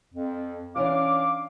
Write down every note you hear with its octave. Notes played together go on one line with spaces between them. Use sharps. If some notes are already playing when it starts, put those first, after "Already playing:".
F2
E3 C#4 D4 F5 D6